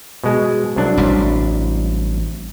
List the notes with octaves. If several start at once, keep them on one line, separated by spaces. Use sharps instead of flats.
B2 G#3
C2 F#3 D4
A1 G3